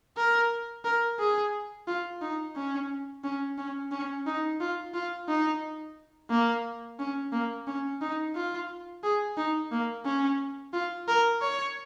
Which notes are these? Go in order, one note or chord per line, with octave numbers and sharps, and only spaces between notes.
A#4
A#4
G#4
F4
D#4
C#4
C#4
C#4
C#4
D#4
F4
F4
D#4
A#3
C#4
A#3
C#4
D#4
F4
G#4
D#4
A#3
C#4
F4
A#4
C#5